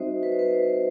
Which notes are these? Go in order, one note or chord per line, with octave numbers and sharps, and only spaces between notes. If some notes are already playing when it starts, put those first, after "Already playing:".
Already playing: G3 C4 D#4 F#4 C5 D#5 E5
B4
C5
B4
C5